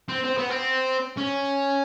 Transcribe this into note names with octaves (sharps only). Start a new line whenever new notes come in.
C4
C4
B3
C4
C#4